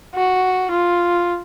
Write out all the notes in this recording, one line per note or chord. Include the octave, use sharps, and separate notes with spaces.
F#4
F4